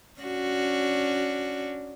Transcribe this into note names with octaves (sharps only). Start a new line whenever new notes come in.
C#4 D4 F#4